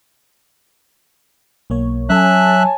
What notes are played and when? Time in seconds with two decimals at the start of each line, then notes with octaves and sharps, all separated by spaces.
1.70 B1 A#3 C#5
2.09 F#3 C#4 A4 C#5 E5 G#5 A5 F#6